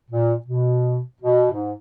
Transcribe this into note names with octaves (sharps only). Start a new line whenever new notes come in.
A#2
B2
B2
G#2